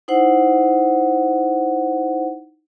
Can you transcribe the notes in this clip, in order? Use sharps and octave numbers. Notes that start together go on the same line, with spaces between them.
D#4 E4 C5 F#5